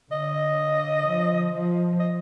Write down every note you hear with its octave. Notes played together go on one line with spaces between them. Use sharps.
D3 D#5
F3
F3
D#5